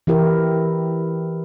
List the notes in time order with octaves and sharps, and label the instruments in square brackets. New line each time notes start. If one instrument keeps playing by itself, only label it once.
[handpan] E3 E4 G4 A#4